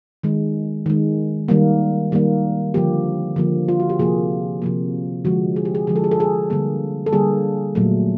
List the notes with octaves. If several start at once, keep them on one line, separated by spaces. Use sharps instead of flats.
D#3 G#3
D#3 G#3
D#3 G3 A#3
D#3 G3 A#3
D3 F3 A#3 G4
D3 F3 A#3
F4
F#4
G4
C3 F3 A#3 G#4
C3 F3 A#3
D3 F3 G#3 F#4
G#4
G4
G#4
D3 F3 G#3 G#4
A4
G#4
A4
G#4
D3 G3 A#3 G#4
A4
D3 G3 A#3 G#4
A#2 F#3 A3